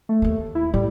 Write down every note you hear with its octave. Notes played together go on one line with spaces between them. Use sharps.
A3
D#2 A#3
E4
A2 G3